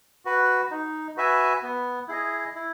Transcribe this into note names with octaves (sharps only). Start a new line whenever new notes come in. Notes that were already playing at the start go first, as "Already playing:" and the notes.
F#4 B4
D#4
F#4 B4 E5 G#5
B3
E4 G#4 D#5
E4